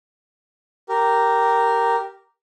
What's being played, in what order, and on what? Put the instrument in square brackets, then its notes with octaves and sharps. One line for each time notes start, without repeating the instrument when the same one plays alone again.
[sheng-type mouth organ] G4 A#4